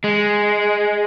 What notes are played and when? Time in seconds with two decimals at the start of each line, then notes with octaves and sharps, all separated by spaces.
0.04 G#3